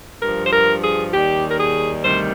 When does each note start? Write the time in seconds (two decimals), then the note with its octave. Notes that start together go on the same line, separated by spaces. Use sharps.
0.22 G2 F3 A#4
0.46 C5
0.52 A#4
0.83 G#4
1.14 D#2 D#3 G3 G4
1.51 A#4
1.59 G#4
2.04 D2 C3 D#3 G3 C5